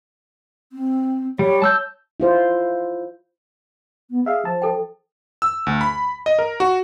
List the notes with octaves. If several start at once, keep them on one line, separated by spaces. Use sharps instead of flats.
C4
G3 C#5
A5 E6 G6
E4 F4 C5
B3
G#4 E5 F5
F3 A5
A4 G5
E6
D2
B5
D#5
A#4
F#4